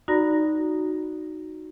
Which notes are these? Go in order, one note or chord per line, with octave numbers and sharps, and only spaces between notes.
D#4 F#4 D5 A#5 B5 A#6